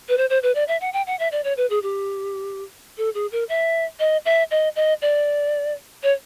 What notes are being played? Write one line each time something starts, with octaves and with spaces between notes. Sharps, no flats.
B4
C5
C5
B4
D5
E5
F#5
G5
F#5
E5
D5
C#5
B4
G#4
G4
A4
G#4
A#4
E5
D#5
E5
D#5
D#5
D5
C#5